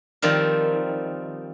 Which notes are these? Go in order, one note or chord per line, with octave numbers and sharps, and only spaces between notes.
D#3 F3 G3 C4 A#4